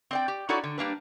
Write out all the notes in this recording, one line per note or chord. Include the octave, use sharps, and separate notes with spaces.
C4 D5 G5
G4
D#4 E4 F#4 A4 C#5 D5
D3
G3 A#3 D4 B4